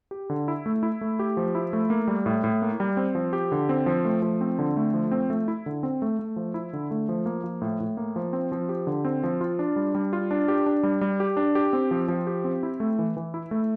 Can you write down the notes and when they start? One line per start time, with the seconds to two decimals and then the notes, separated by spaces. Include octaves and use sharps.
0.11 G4
0.30 D3
0.48 E4
0.66 A3
0.83 E4
1.01 A3
1.19 G4
1.37 F3
1.55 E4
1.73 A3
1.90 A#3
2.08 G3
2.26 A2
2.44 A2
2.62 A#3
2.80 G3
2.97 C4
3.15 F3
3.33 G4
3.52 D3
3.69 C4
3.86 F3
4.05 A3
4.22 F3
4.41 C4
4.59 D3
4.77 A3
4.94 F3
5.11 C4
5.30 A3
5.48 E4
5.66 D3
5.83 C4
6.02 A3
6.19 A3
6.36 F3
6.54 E4
6.73 D3
6.91 A3
7.09 F3
7.26 A#3
7.44 F3
7.62 A2
7.80 A2
7.97 A#3
8.16 F3
8.33 C4
8.52 F3
8.69 G4
8.87 D3
9.05 C4
9.23 F3
9.41 F4
9.59 D4
9.76 G3
9.95 G3
10.13 F4
10.31 D4
10.48 G4
10.66 D4
10.83 G3
11.01 G3
11.20 G4
11.37 D4
11.55 G4
11.73 C4
11.91 F3
12.08 F3
12.27 G4
12.44 C4
12.63 E4
12.80 A3
12.99 E3
13.17 E3
13.34 E4
13.51 A3